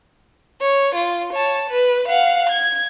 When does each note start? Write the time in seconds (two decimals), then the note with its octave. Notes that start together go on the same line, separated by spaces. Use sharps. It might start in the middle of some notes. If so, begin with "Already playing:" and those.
0.61 C#5
0.95 F4
1.33 C#5 A5
1.70 B4
2.08 F5 F#5
2.50 G#6